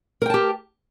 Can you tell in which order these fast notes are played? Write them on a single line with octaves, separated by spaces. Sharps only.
A#4 G5 A5 G4